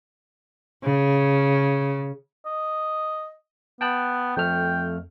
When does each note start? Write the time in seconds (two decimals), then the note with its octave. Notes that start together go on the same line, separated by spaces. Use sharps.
0.84 C#3
2.46 D#5
3.81 B3 G5 A5 F#6
4.37 F2 A3 G5 F6